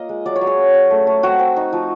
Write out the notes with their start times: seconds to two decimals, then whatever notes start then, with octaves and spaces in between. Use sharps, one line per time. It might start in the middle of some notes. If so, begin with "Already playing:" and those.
Already playing: A#3 F4 D#5
0.09 G#3
0.26 F#3 D5
0.36 C#5
0.41 F#3
0.47 G#4
0.57 C#4
0.74 C#4
0.90 A3
1.07 A3
1.23 C4 F#4
1.39 C4
1.56 D#4
1.73 F3